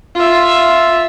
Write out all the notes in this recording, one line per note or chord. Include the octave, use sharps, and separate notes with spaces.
F4 E5